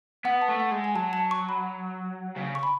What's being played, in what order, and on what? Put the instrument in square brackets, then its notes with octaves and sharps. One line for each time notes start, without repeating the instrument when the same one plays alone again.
[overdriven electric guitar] B3 [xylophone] F#5
[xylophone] A5
[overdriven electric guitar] A3
[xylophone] F#5
[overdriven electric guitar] G#3
[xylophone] G#5
[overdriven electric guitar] F#3 [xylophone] A5
[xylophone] A5
C#6
B5
[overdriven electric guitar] C#3
[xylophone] C#6
B5